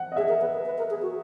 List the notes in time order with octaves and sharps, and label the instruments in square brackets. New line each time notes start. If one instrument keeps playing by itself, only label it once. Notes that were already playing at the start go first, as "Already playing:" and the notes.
Already playing: [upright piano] F#5
D#5
[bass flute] G#4 [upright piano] E5
[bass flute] A#4
B4
B4
B4
A#4
G#4
F#4